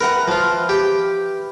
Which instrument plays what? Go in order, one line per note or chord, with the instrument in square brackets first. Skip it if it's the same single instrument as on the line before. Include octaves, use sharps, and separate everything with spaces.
[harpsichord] A#4 F#5 A#5 [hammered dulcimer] B4 E5 G5
[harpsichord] F3 F4
G4